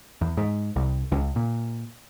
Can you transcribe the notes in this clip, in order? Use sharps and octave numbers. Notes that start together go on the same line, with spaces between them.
E2
G#2
C2
C#2
A#2